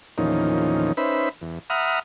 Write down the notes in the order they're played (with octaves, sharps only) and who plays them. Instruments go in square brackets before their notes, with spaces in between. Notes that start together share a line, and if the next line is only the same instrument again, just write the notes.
[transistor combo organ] E2 A#2 D#3 F3 C#4 D#4
C#4 D#4 B4 C5 E5 B5
E2
E5 F#5 A#5 B5 D#6 F6